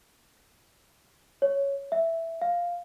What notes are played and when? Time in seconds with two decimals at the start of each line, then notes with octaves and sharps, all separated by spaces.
1.42 C#5
1.92 E5
2.42 F5